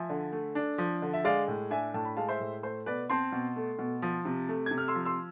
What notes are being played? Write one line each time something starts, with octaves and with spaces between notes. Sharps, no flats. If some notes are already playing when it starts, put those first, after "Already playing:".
Already playing: F3 E5 G#5
D3
A3
D4
F3
D3
E5
G#3 D5 F5
A2
D4 E5 G#5
A2 A5
B5
G#3 F5 A5
C5 E5
A2
A3 C5
B2 B4 D5
C4 A5 C6
B2
A3
B2
F3
C3
A3
C3 G#6
F6
C6 E6
F3
C6 E6